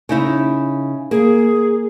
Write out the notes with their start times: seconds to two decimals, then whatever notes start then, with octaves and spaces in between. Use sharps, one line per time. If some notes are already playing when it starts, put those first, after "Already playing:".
0.09 C#3 D#4 E4
1.11 A#3 G#4